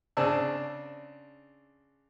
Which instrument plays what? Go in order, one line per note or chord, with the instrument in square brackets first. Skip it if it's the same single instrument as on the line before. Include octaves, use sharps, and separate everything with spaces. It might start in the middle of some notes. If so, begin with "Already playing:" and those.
[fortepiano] C#3 C4 D4 A5 E6